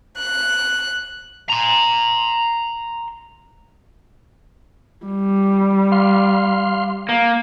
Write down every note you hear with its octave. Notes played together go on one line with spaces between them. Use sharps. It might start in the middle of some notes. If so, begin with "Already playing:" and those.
F#6
A#5 C6
G3
F5 C6
A#3